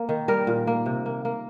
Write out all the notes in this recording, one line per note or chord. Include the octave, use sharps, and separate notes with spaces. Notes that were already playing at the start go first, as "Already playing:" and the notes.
Already playing: A#3
D#3
G3 A#4
A#2
A#3
C3
A#3
A#3